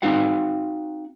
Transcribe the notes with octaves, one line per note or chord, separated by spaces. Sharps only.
C4 D#4 F#4 F5 F#5